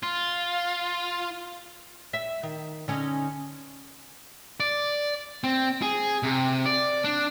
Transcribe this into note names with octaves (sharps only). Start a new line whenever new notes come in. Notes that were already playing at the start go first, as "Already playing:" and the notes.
F4
E5
D#3
D3 C#4 D#4
D5
C4
G#4
C3
D5
D4